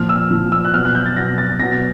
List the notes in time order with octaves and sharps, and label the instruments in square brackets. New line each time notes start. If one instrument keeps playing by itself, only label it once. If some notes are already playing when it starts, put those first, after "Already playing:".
Already playing: [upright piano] A#2 F3 F6
E6
A#2 F3
E6
F#6
B2 F#3 F6
F#6
G6
A6
B2 F#3 A#6
A6
B2 F#3 A#6
A6